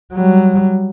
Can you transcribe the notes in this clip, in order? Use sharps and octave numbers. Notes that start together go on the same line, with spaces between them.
F#3 G3